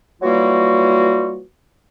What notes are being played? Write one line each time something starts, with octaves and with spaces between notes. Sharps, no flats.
E3 F#3 G3 A#3 F4 F#4